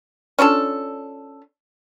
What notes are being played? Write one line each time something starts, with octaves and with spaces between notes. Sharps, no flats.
C#4 D4 F4 A4